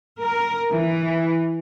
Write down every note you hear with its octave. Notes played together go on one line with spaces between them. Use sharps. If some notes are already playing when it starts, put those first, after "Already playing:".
A#4
E3